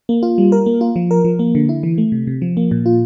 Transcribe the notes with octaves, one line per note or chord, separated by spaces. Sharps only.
A#3
F4
G3
A#4
A#3
F4
F3
A#4
F3
A#3
D3
E4
E3
A3
C3
C3
F3
A#3
A#2
F4